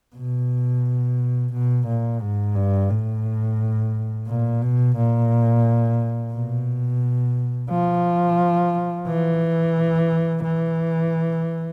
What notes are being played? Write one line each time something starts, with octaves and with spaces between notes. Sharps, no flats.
B2
B2
A#2
G#2
G2
A2
A#2
B2
A#2
B2
F3
E3
E3